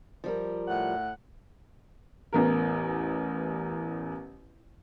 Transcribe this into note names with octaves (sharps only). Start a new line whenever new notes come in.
F3 G3 A#4
A2 F#5
A1 E2 A#4